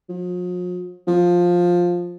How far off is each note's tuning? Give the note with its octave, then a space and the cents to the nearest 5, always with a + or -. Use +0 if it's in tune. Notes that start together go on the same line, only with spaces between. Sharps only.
F3 +45
F3 +10